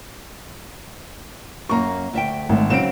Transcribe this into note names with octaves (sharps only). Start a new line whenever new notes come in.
F#2 A#3 A#5 C#6
D2 E5 G5
G#1 A3
C#3 F#3 C4 D7 E7